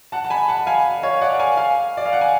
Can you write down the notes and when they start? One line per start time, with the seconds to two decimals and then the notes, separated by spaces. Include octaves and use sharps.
0.12 F#5 A5
0.24 A5
0.30 G#5 B5
0.48 F#5 A5
0.66 F5 G#5
1.03 C#5 F5
1.21 D5 F#5
1.39 F5 G#5
1.57 F5 G#5
1.97 D5
2.06 F5
2.13 F#5
2.21 G#5